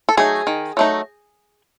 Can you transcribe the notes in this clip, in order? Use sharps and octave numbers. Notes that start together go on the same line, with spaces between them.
A4
F#3 A3 D#4 G#4
D#3
F#3 A3 D#4